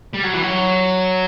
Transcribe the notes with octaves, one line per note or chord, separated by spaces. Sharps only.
G3
F#3
E3
F#3